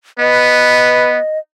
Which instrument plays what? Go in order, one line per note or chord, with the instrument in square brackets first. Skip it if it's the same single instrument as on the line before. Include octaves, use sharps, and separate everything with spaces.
[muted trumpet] B3 [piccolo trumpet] B4 [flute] D#5